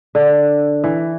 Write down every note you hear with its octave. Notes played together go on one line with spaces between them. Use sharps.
D3
E3